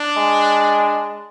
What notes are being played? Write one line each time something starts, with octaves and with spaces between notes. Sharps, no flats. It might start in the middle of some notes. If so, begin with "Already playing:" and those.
Already playing: D4
G#3